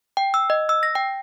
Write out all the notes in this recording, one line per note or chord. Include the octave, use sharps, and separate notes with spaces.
G5
E6
D#5
E6
A#6
G5